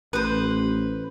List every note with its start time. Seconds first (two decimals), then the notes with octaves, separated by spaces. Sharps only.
0.13 A1 B4 C5